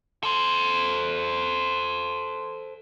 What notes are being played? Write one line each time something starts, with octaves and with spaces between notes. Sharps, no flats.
A4 C5